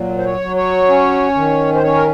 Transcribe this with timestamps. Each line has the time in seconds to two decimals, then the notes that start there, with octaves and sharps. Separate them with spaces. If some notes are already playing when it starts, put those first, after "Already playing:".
Already playing: A#2 F#3
0.18 C5
0.25 C#5
0.41 F#3
0.56 C#5
0.88 C#4
1.35 D#3
1.74 C5
1.83 C#4 C#5
1.95 A#4